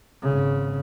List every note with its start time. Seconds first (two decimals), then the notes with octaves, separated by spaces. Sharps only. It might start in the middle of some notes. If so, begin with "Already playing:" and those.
0.22 G#1 C#3